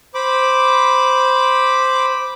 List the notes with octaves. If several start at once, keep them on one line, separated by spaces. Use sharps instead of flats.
C5 B5 D6